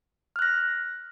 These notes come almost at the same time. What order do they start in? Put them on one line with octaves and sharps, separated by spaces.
F6 F#6 A#6